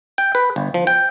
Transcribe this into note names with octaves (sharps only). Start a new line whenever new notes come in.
G5
B4
G1
F3
G5